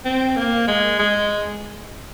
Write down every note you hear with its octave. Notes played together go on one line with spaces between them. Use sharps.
C4
A#3
G#3
G#3